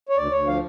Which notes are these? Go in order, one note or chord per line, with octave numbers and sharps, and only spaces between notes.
C#5
D2 D5
D2 C#5
F3 F5